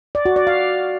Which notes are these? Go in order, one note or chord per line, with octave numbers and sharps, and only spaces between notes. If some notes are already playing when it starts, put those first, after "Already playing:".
D5
F#4
D5
F5